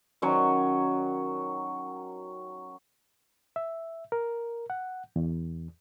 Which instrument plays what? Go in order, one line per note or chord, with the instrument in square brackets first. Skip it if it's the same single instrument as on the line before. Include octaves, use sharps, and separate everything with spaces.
[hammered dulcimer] D#3 F#3 C#4 C#5
[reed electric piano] E5
A#4
F#5
E2